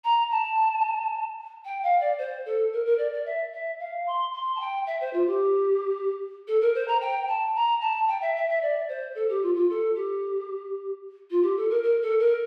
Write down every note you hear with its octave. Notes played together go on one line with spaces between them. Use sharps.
A#5
A5
G5
F5
D5
C5
A4
A#4
A#4
D5
D5
E5
E5
F5
C6
C6
A5
G5
E5
C5
F4
G4
A4
A#4
C5
A#5
G5
A5
A#5
A5
G5
E5
E5
E5
D5
C5
A4
G4
F4
F4
A4
G4
F4
G4
A4
A#4
A#4
A4
A#4